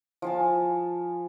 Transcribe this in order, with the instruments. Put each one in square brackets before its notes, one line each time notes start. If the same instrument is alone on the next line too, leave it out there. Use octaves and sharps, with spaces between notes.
[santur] F3 G#5 A5